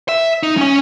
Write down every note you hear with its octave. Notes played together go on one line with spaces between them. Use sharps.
E5
D#4
C#4 G#5